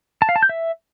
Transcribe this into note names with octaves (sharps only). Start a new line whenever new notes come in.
A5
F5
A5
G6
E5